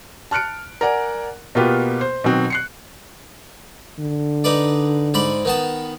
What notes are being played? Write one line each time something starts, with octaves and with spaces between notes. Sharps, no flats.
A5 F6 F#6 C#7 D7
A#4 D5 F#5 G#5
B2 A#3 B3 F4 G4 B4
C5
B2 D#3 F#3 C4
F#6 C7 C#7
D3
D#4 B4 D5
G#2 D5 B5
D#3 B3 A5